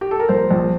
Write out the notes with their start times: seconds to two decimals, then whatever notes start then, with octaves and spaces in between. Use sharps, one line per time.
0.01 G4
0.11 A4
0.19 A#4
0.29 A#1 C5
0.51 A#1